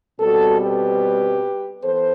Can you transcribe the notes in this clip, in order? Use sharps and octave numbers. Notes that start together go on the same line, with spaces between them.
B2 G3 C4 F#4 A4
G4 B4
E3 B3 A4 C5